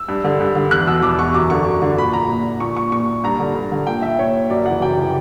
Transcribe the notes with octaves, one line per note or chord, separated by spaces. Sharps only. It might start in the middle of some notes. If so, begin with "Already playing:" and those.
Already playing: E6
G2
D3
G2
D3
E2 F#6
B2 E6
E2 D6
B2 C#6
F#2 D6
D3 C#6
F#2
D3
A#2 B5
A#5
A#2
A#2 C#6
C#6
A#2 C#6
G2 A#5
D3
G2
D3
A#2 G5
E5
A#2 C#5
F#2 D5
C#3 E3 F#5
F#2 G5
C#3 E3